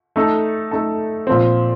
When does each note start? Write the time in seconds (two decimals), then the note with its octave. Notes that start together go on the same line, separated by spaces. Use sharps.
0.16 A3 D#4 A4
0.71 A3 D#4 A4
1.27 A#2 F3 C4